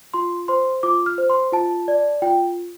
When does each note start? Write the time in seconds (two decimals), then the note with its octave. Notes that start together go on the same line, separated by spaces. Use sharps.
0.14 F4 C6
0.48 C5 C6
0.83 F4 D6
1.06 F6
1.18 C5
1.30 C6
1.52 F4 A5
1.88 D5
2.22 F4 G5